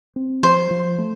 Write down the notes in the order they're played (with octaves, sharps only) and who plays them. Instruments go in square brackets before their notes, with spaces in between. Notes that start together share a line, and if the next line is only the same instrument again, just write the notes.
[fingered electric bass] C4
[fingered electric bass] F3 [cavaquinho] C5
[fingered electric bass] F3
A3